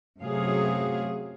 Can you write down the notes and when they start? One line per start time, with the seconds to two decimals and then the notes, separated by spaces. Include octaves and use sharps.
0.20 F#2 C3 F#3 A3 G#4 F5